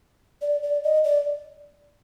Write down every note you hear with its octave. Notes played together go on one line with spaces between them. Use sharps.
D5
D5
D#5
D5